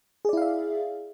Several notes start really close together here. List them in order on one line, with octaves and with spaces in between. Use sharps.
G#4 D5 E4 F5 E5